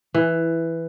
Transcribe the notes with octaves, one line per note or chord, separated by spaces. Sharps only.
E3